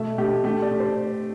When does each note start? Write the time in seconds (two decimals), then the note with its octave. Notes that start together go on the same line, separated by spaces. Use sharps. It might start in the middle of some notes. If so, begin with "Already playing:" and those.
Already playing: B2 A3 E5
0.18 A3 G4
0.44 A3 G4
0.62 D5
0.71 A3
0.80 C5